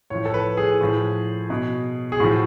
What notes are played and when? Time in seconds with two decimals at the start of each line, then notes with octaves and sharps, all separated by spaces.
0.10 A2 F3 C#5
0.25 A4
0.34 B4
0.57 G#4
0.81 A2 F3
1.50 B2
2.12 G#4
2.19 A2 F3 F#4